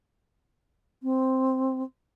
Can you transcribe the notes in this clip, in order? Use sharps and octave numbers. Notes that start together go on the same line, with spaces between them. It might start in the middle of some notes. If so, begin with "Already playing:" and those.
C4